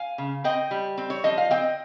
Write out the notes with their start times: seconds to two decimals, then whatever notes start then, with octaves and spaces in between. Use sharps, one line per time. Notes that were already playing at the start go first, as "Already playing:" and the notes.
Already playing: F5 G#5
0.18 C#3
0.44 C4 D#5 G5
0.71 G3
0.98 C4
1.10 C#5
1.24 F3 D#5
1.38 F5
1.51 C4 D#5 G5